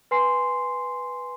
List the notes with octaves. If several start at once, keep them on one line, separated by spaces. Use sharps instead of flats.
B4 G#5 C6 C7